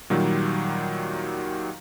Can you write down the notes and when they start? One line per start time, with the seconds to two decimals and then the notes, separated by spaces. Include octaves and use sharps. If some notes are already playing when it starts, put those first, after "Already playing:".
0.10 A#2 D#3 F#3 G3